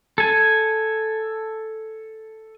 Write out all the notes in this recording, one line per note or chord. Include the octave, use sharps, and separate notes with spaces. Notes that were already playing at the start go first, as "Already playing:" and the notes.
A4 G#5